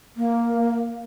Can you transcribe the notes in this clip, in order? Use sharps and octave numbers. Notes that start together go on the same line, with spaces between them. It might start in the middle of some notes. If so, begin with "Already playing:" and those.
A#3